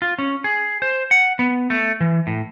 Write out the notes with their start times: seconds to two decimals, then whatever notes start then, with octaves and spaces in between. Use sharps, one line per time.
0.02 F4
0.19 C#4
0.44 G#4
0.82 C5
1.11 F#5
1.39 B3
1.70 A3
2.01 E3
2.27 A2